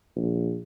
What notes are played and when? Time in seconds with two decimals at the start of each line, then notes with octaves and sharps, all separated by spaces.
0.16 A#1